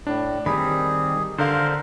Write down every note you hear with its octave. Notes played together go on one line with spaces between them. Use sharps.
A2 D4
D#3 G3 C4 G#4 B5
D3 A#4 C5 F5